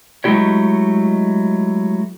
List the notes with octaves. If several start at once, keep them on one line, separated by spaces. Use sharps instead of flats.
F#3 G#3 A3 E4 G4 C#5